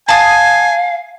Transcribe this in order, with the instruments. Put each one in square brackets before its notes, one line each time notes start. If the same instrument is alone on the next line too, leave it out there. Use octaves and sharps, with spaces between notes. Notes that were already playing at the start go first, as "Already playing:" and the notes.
[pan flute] F5 [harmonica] G#5 [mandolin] A5 D#6